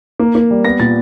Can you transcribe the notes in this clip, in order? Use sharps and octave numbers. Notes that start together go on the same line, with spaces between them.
A#3
A#3
G3
B3 A#6
A#2 A6